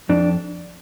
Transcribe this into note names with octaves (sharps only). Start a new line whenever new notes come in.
F2 D4